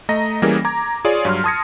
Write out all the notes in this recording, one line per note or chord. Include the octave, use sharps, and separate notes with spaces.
A3 D#5 A#5 A#6
E3 G3 A#3 C#4 G#4 A#4
A#5 D6 G#6
F4 G#4 C#5 D5
G2 F#3 C6 F6
A5 C6 D#6 G#6 A#6 C#7